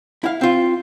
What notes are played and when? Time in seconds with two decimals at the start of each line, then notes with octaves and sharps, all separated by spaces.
0.24 E4 F5
0.41 C4 F4